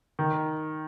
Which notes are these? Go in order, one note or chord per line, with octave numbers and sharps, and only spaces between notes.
D#3